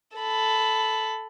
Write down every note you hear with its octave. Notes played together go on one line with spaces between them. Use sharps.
A4 B5